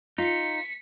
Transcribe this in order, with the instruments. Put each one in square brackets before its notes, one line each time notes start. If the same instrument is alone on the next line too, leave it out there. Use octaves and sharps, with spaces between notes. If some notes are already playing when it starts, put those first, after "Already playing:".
[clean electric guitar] D#4 [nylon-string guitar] F4 [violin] B6 C#7